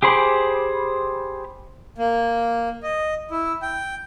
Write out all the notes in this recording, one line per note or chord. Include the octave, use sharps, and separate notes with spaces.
G4 G#4 C5 B5 D6
A#3
D#5
E4
G5